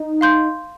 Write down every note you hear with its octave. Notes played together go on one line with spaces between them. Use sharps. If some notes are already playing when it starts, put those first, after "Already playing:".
Already playing: D#4
F5 C6 G6